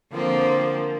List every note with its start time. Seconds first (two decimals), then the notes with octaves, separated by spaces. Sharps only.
0.13 D3 F3 A#3 C4